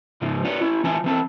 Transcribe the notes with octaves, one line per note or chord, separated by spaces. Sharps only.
G#2 C#3 F3
F4 B4 C#5 D5
C#4 E4
E3 F4 G#5 A5
E3 C4 A5